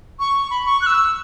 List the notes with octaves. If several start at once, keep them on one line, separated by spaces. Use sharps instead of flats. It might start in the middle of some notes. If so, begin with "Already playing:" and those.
C#6
B5
C#6
F#6
E6